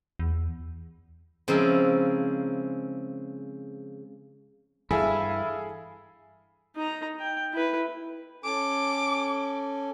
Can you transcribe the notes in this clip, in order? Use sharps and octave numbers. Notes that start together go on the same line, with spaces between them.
E2
C#3 F3 G#3 C4 E4 A#4
G2 E3 E4 G#4 A4 E5 F5 G#5
D#4 A#5
G5
E4 B4
C#4 A4 G#5 D6